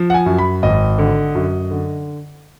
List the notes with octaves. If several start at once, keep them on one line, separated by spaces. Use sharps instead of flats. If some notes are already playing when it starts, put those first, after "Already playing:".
Already playing: F3
F#5
G#5
F#2
B5
G#1 D#5
D3
F#2
D3